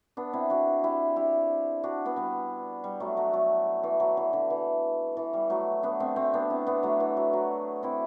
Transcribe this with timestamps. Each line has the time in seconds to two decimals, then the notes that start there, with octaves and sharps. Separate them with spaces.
0.17 B3 D4
0.33 C4 E4
0.50 D4 F#4
0.83 E4 G4
1.16 E4 G4
1.83 D4 F#4
2.05 B3 D4
2.16 G3 B3
2.84 G3
3.00 F#3 A3
3.17 F#3 A3
3.33 F#3 A3
3.83 E3
4.00 F#3
4.17 E3
4.33 D3
4.50 E3
5.17 E3
5.33 G3
5.50 F#3 A3
5.83 B3 D4
6.00 A3 C4
6.16 A3 C4
6.34 B3 D4
6.50 C4 E4
6.67 B3 D4
6.83 F#3 A3
7.00 E3
7.17 F#3
7.33 F#3
7.83 C4 E4